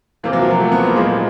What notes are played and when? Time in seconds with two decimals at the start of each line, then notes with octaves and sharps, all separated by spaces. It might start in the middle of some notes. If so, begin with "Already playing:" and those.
0.23 C3 E3 A#3
0.33 F#3
0.42 F3
0.51 F#3
0.60 A3
0.72 B3
0.84 A#3
0.95 A#2 F3 G#3